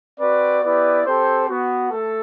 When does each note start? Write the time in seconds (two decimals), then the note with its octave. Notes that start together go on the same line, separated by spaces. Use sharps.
0.19 C4 F#4 B4 D5
0.62 B3 E4 G4 B4 D5
1.05 C4 G4 A4 C5
1.48 B3 F#4
1.91 A3 A4